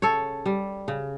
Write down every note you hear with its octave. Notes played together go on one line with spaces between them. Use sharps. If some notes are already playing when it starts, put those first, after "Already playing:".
C#3 A4 C#5
G3
C#3